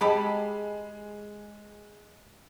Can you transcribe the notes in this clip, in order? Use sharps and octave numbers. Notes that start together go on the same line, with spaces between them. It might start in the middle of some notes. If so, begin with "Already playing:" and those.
G#3 G4 A4 B5